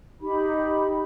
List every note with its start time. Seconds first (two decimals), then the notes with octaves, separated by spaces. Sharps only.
0.21 D#4 G4 B5